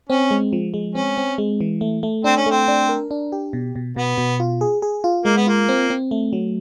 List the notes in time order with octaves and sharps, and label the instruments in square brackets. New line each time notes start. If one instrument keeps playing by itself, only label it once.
[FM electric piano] C4 [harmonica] C#4
[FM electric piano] G#3
F3
G#3
[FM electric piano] C4 [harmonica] C#4
[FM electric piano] C4
G#3
E3
A3
A3
[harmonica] C4 [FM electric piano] D4
[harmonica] C#4
[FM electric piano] A3 [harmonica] C4
[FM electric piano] D4
A#4
D4
G4
B2
B2
[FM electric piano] B2 [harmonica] B3
[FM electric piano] B2
F4
G#4
G#4
F4
[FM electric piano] G#3 [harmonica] A#3
[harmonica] B3
[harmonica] A#3 [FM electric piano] F4
[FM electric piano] C4
C4
A3
F#3